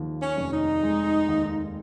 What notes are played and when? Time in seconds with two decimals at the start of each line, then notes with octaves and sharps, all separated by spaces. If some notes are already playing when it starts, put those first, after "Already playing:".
Already playing: D#2 F3
0.22 C#4
0.37 F1
0.53 D#4
0.83 G#3
1.28 D#2